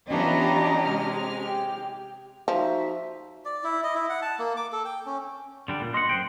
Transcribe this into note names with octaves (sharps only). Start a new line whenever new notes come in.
E3 B3 C#4 D4 F4 G4 D#5 A#5
C3 G#3 F6
G4
F3 D#4 F#4 E5
D5
E4
D#5
E4
F#5
A5
A#3
D6
A4
G5
C#4
D3 G3 D4
A#2
D#5 F#5 C6
F#2 C5 G5